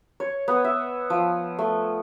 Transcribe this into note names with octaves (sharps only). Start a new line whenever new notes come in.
C#5
B3
E5
F3
A3